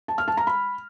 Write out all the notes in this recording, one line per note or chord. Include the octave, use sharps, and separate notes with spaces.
A5
F6
A5
A#5
B5